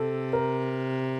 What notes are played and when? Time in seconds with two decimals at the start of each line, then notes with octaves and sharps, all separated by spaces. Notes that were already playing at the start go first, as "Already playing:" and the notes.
Already playing: C3 A4
0.33 A#4